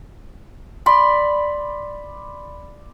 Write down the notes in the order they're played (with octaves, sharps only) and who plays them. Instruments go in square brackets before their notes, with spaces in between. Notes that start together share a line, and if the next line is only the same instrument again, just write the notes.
[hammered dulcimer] D5 B5 C6